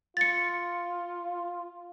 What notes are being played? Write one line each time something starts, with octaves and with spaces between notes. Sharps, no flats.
F4 A6 C#7